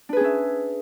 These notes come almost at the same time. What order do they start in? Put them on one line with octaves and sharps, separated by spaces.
D4 B4 G#4 C#4 E5